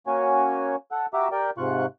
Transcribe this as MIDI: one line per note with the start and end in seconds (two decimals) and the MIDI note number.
0.07 0.75 58
0.07 0.75 61
0.07 0.75 66
0.07 0.75 73
0.07 0.75 80
0.92 1.06 69
0.92 1.06 78
1.14 1.28 66
1.14 1.28 67
1.14 1.28 76
1.14 1.28 82
1.14 1.28 86
1.32 1.50 67
1.32 1.50 70
1.32 1.50 74
1.32 1.50 79
1.58 1.86 44
1.58 1.86 48
1.58 1.86 65
1.58 1.86 85
1.58 1.86 90